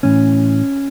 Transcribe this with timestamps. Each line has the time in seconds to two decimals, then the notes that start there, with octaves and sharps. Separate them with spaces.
0.03 A2 E3 C#4